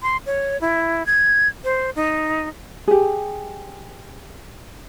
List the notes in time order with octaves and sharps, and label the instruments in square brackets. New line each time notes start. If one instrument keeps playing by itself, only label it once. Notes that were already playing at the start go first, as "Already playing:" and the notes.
[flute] C6
C#5
E4
G#6
C5
D#4
[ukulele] G4 G#4